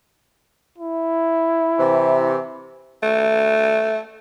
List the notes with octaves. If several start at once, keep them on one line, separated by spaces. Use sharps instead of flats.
E4
C3 E3
A3